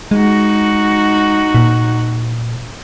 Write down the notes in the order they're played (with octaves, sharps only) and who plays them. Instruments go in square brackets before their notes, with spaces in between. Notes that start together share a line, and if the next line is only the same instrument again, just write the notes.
[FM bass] G#3 [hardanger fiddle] D#4 F#4
[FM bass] A#2